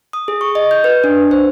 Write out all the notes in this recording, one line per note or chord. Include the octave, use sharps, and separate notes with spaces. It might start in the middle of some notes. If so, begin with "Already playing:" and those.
D#6
G#4
C#6
D#5
G6
B4
D4
C5